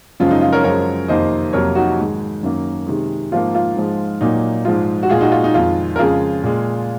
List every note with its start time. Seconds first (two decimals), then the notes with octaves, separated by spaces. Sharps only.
0.20 F#2 C#3 F3 G#3 F4
0.31 D#4
0.41 F4
0.53 A#4 C#5
0.64 F#2 F3 G#3 A#4 C#5
1.08 F2 C3 D#3 A#3 C5 D#5
1.53 F2 C3 F#3 A#3 A#4 C#5
1.75 D#4 F#4
1.98 G#2 D#3 G#3
2.43 F#2 D#3 A#3
2.87 C3 D#3 G#3
3.32 G#2 F3 A#3 F4
3.55 F4
3.76 G#2 F3 G#3
4.21 A#2 F#3 A#3 D#4
4.65 G#2 F3 G#3 F4
5.03 F#4
5.10 A#2 G#3 F4 G#4
5.21 D#4 F#4
5.32 F4
5.44 D#4
5.54 F2 D#3 G#3 F4
5.96 A#4
5.99 F2 C#3 G#3 F4 G#4
6.43 A#2 G#3